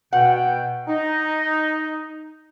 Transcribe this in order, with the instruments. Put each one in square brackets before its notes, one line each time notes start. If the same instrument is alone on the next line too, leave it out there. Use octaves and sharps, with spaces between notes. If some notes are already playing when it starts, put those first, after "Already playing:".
[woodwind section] B2 G5 [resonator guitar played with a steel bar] F#5
[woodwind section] D#4